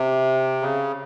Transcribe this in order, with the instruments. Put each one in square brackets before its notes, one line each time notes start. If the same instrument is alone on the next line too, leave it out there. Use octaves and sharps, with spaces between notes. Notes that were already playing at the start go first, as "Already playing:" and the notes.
Already playing: [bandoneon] C3
C#3